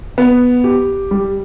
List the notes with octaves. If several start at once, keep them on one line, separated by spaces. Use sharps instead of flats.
B3
G4
G3